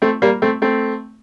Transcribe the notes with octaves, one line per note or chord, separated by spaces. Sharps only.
A3 C4
G3 A#3
A3 C4
A3 C4